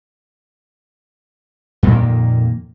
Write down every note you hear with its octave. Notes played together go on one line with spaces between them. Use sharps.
F2 A#2 D#3 A#3